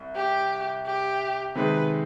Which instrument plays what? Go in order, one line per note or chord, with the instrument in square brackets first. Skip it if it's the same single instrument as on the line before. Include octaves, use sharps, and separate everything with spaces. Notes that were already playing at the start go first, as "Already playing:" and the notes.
Already playing: [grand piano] C2
[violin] G4
G4
[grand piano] C3 D#3 G#3 [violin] B4